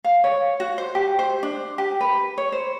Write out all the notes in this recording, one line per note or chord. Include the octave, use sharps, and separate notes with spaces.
F5
C#5
F#4
C5
G4
C5
D4
G4
B4
C#5
C5